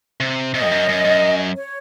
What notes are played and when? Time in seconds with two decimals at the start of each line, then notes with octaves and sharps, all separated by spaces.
0.20 C3
0.54 C3 D#5
0.65 F2
0.71 F#2
0.89 F#2
1.05 F#2
1.56 C#5